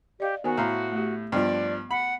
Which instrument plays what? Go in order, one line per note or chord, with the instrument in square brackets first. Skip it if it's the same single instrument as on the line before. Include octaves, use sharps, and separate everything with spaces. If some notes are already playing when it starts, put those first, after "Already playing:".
[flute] G4 [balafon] D5 D#5 F5
[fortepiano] D#3 [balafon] B3 C5 G#5 [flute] F#4
[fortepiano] A2 F5 [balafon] A#5 C6
[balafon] A3 G4
[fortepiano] G2 F3 [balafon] B3 D#5 [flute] D5
[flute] F#5 [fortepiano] B5